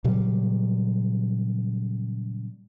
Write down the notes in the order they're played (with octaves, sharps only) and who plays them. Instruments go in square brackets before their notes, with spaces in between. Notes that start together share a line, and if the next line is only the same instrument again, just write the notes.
[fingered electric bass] A#2 C#3 F#3 G3